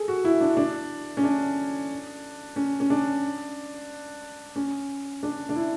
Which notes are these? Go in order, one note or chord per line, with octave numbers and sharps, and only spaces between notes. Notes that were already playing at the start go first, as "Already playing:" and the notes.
Already playing: G#4 A4
F#4
E4
D4
D4
C#4
D4
C#4
C#4
D4
C#4
D4
D4
E4